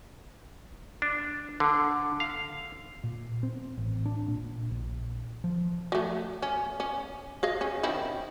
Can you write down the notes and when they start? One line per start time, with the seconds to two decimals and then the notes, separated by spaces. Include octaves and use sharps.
1.02 D4
1.60 D3
2.20 F5
3.04 A#2
3.43 C4
3.78 A1
4.06 D4
4.28 A#2
4.71 A#1
5.44 F3
5.92 F#3 A3
6.42 C#4
6.80 C#4
7.43 G#4 D#5 F5
7.61 C#4
7.83 D#3 C4 E4